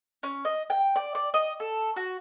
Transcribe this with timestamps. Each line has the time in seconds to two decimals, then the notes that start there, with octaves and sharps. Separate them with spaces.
0.23 C#4
0.45 D#5
0.70 G5
0.96 D5
1.15 D5
1.34 D#5
1.60 A4
1.96 F#4